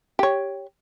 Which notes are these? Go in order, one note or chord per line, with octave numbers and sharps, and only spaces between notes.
G4 C#5